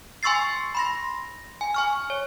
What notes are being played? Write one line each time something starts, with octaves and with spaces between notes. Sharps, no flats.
G#5 C6 C#6 E6 A6 C7
B5 C6 A#6
G#5
G#5 C#6 F6
C#5